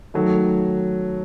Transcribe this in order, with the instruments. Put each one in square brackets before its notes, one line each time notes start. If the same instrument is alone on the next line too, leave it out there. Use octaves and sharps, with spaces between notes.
[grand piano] D#3 F#3 A3